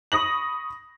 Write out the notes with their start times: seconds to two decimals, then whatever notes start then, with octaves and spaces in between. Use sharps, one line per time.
0.12 B5 C#6 D#6 A#6 F#7